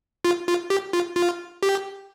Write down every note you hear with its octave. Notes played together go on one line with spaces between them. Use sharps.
F4
F4
G4
F4
F4
G4